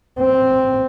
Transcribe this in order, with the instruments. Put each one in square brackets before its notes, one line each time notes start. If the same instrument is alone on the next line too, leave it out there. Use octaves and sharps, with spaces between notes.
[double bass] C4